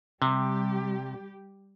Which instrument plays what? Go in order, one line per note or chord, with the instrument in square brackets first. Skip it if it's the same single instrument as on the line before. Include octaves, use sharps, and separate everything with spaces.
[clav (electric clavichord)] C3 [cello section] G3 G4